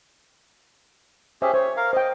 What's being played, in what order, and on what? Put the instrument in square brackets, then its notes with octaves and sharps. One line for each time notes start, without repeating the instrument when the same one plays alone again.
[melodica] C#4 G4 G#4 [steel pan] C5 E5 G#5
[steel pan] C5 [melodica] C#5
[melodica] A#4 F5
[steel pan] C5 G5 [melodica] D#5